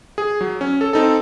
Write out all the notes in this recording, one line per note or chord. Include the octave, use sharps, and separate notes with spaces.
G#4
F#3
C#4
A4
C4 D#4 A4